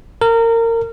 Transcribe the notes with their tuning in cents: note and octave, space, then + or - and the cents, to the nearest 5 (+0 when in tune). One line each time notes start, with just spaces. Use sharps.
A#4 -25